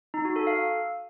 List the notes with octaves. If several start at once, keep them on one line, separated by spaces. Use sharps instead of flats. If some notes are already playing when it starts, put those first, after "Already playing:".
D#4
F#4
A4
F5